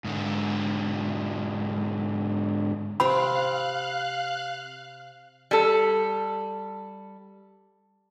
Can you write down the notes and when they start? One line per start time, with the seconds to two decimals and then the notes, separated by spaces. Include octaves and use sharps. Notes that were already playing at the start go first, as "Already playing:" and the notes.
0.05 G#2 D3
3.00 C3 C4 F5 B5 C6 F#6
5.51 G3 A4